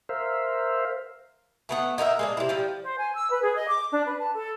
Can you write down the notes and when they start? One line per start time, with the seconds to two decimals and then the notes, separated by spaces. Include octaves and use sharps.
0.09 A#4 C5 E5 F5
1.69 A3 B3 F#5
1.98 D#4 A#4 C5 E5
2.19 G#3 A#3 D4
2.37 C3 E4
2.49 F3 G3
2.82 C5
2.98 G#5
3.14 E6
3.30 B4
3.42 G#4
3.56 D#5
3.68 D6
3.90 D4
4.05 B4
4.18 A5
4.34 A4